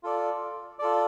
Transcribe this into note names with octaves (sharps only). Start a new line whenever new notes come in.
F4 A4 D5
F4 A4 D5